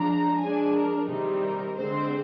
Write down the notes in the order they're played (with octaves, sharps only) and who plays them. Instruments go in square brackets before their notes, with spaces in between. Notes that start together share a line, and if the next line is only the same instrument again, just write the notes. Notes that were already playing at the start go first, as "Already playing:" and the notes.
Already playing: [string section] F3 G#3 D4 A#5
F3 G#3 D4 G#5
A#4
C3 D#3 G3 C4 D#4
A#4
D3 G#3 C4 C5